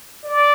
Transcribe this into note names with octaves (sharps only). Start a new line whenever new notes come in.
D5